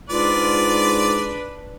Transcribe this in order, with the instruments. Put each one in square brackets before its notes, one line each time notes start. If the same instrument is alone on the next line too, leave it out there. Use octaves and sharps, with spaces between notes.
[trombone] G#2 [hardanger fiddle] D4 B4 [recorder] F4 [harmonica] D5